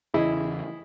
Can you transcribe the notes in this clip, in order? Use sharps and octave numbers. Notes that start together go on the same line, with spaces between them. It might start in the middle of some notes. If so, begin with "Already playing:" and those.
E2 C#3 E3 E4 G#4 D#5